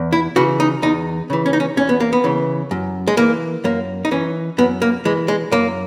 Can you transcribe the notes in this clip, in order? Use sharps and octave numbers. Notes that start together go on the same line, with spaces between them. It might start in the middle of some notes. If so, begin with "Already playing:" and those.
Already playing: E2
E4
C#3 E3 F#4
D#4
E2 D#4
C#3 E3
C#4
D#4
C#4
E2 C#4
B3
A#3
B3
C#3 E3
F#2
G#3
E3 A#3
F#2 A#3
D#4
E3 C#4
F#2 B3
A#3
E3 G#3
G#3
F#2 A#3